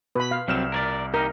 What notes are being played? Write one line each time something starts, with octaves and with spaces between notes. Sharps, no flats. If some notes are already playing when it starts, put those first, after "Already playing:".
B2 B4 B5
F5
C2 F#3 C4 F6 E7
A#4 C#5 D5
D#4 G4 A#4